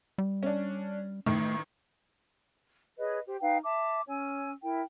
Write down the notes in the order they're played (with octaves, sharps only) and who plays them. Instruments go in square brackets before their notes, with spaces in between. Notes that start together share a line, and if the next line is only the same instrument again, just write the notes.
[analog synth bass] G3
[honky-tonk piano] C#4 D4
[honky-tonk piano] A1 D#3 [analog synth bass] A3
[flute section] G#4 B4 C#5 D#5
G4 C5
D#4 B4 F5 G5
E5 A5 D6
C#4 C#5 G#5 E6
E4 A#4 G5